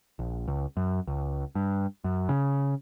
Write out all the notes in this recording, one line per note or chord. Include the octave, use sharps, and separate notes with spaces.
A#1
C#2
F#2
C#2
G2
F#2
C#3